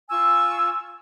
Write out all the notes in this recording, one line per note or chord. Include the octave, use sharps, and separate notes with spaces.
F4 G#5 C#6 E6